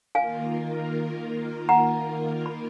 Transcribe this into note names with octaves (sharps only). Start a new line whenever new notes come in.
D#3 A#3 F4 A#4 F5 G#5
F#5 A#5
B5